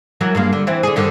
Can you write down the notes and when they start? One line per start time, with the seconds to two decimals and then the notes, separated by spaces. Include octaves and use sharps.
0.21 E3 F#3 A#4
0.35 G2 G#3 A#3
0.53 D3
0.67 E3 C4 E4
0.83 D3 G#4
0.96 G2 D3 D#3